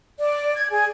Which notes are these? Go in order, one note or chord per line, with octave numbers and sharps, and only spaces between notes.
D5
G#6
G#4